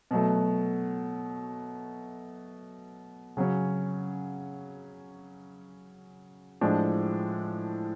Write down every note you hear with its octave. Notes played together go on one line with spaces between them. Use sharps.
B2 F#3 A3
C#3 F#3 C#4
A2 F3 G#3 D4